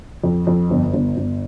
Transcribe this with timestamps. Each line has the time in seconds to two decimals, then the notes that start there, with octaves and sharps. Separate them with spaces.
0.24 F2
0.47 F2
0.70 G1
0.93 G1
1.17 G1